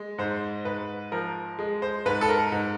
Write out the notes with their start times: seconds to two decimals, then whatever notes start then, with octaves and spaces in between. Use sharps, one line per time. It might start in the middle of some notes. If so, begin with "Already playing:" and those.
Already playing: G#3
0.18 G#2 C5
0.65 G#2 B4
1.12 F3 A#4
1.59 G#3
1.82 C5
2.06 G#2 B4
2.21 A4
2.29 A#4
2.52 G#2